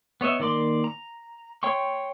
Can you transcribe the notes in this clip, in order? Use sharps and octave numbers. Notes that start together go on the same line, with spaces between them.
B3 C#5 D#5 E5
D#3 A#3 D5 C6 D6
A#5
C#5 G5 C6 C#6